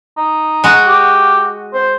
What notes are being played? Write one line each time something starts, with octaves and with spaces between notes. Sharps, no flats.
D#4
G#3 F#4
G4
C5